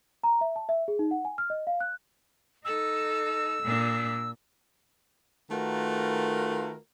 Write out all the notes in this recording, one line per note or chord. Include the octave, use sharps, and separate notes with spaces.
A#5
E5
A5
E5
G#4
D#4
F#5
G#5
F6
D#5
F5
F#6
D#4 A4 E6
A#2 D4
D#3 A3 F4 F#4 A#4 B4